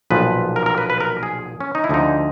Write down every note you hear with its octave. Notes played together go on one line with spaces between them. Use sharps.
B1 A#2 F3 B4
A#4
A#4
B4
B4
A#4
G#4
C#4
D#4
E4
D2 D3 F3 D#4